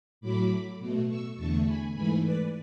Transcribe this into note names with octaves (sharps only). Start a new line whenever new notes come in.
A2 F#3 A3 B5 D6
B2 A3
C#6 E6
E2 D3 A3 A5 C#6
G#5 B5
G#2 E3 A3 G#5 B5
B4 D5